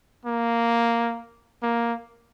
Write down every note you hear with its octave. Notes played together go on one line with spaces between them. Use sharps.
A#3
A#3